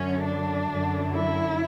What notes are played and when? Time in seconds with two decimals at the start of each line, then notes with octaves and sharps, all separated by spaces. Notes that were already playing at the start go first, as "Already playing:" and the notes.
Already playing: F#2 D3 C#4
0.25 D4
0.69 F#2 D3
1.12 E4